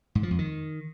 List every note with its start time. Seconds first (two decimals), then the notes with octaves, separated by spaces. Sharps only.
0.15 G#2
0.23 F3
0.31 F2
0.39 D#3